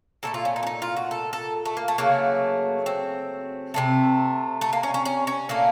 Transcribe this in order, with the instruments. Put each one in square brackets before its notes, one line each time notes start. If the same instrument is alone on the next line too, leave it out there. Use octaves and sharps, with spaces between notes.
[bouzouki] A#2 F#3 A3 A4
F4
C#4
D#4
C#4
D#4
F4
F#4
A4
A4
A3
A#3
A3
C#3 F#3 A3 A#3
C4
C3 F3 A3
A3
A#3
C#4
C#4
C#4
C#4
A#2 A3 A#3